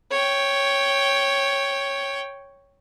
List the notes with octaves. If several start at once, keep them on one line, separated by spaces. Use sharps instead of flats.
C#5 G5